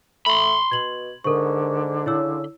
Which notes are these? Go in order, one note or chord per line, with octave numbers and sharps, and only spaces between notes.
A3 B5 C6
B2 G#6 F#7
G#2 D3 A#4 C#6
C#3 E4 C#5 E6